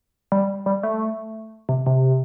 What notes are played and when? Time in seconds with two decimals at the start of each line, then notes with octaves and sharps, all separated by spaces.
0.32 G3
0.66 G3
0.83 A3
1.69 C3
1.86 C3